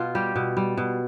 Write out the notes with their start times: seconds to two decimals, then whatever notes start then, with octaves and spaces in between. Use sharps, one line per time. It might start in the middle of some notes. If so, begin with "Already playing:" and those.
Already playing: B2 F4
0.15 G3 G4
0.36 B2
0.57 G3
0.77 B2